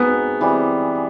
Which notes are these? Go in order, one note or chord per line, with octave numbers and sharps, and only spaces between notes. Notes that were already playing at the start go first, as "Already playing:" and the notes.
Already playing: G#3 B3 C4 D#4 F#4
E3 G3 C4